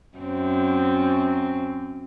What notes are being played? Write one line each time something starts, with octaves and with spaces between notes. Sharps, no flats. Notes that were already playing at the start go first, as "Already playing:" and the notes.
F#2 C4